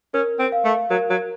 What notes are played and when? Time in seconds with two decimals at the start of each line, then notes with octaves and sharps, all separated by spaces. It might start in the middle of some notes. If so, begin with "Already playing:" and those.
0.14 C#4 A#4
0.39 C4
0.52 F5
0.65 A3
0.90 F#3 A#4
1.10 F#3